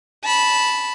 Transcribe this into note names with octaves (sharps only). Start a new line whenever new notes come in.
A5 B5